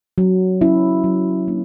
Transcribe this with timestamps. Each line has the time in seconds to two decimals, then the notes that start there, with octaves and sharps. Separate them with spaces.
0.18 F#3
0.61 C#4 E4
1.04 F#3
1.48 A#3 D4